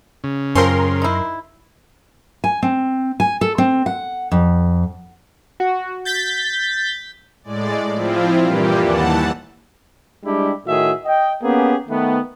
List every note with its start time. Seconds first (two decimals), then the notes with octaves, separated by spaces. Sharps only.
0.24 C#3
0.55 F#2 F3 C4 C#4 A#4 C6
1.02 D#4 E4
2.44 G#5
2.63 C4
3.20 G#5
3.41 A4
3.58 C4
3.86 F#5
4.32 F2
5.60 F#4
6.05 G6 A6 B6
7.44 A2 G#3 D5
7.94 F3 C4 E4 F4
8.42 G2 A#2 E3 G3 A#3 G4
8.80 D#2 E3 F#5 A5
10.25 G3 G#3 D4 E4 G4
10.67 A2 D#3 F#4 G#4 E5
11.05 D#5 G5
11.43 A#3 B3 C#4 G4 G#4
11.89 D#3 A3 B3